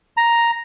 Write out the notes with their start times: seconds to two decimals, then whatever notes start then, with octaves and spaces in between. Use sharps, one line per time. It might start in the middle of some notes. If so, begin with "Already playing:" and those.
0.17 A#5